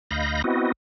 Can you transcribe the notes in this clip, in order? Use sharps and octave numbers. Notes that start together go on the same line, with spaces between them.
D2 D#5 F5 B5 G6 A#6
B3 C4 E4 F#4 D#5